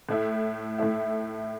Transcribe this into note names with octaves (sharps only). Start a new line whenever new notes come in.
A2 A3 E4
A2 A3 E4